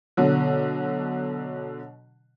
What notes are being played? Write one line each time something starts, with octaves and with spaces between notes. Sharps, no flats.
B2 D3 F#3